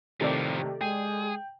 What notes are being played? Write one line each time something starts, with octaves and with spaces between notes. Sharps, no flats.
A2 C3 D#3 F3 A3 G4 A4 D5
G#3 G#4 G5